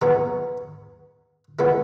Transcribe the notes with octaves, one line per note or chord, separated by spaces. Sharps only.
C#3 E3 B3 D#4
C#3 G#3 B3 E4